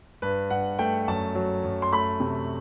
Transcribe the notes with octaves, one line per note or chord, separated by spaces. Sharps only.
G2 B4
G2 F#5
A3 G5
F#2 A5
F#3
F#2
C6
A3 B5
C3